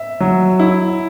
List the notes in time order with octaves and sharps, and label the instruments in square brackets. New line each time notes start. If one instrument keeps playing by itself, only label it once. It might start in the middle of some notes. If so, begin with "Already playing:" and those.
Already playing: [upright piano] E5
[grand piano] F#3
E4